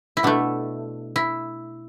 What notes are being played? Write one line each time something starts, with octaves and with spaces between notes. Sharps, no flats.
E4
B2 A3 D4
E4